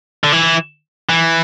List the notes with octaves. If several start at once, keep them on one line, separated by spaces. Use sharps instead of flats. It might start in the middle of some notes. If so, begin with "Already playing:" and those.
D3
E3
E3